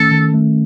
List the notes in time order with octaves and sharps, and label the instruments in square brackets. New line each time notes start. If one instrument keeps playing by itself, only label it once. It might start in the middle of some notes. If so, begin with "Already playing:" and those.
Already playing: [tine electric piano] D#3 A3 C#4 [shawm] A4
[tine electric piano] D#3
A3